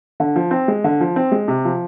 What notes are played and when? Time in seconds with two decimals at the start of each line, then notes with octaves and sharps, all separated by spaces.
0.20 D3
0.36 F3
0.51 C4
0.68 G#3
0.84 D3
1.01 F3
1.16 C4
1.32 G#3
1.48 C3
1.65 F3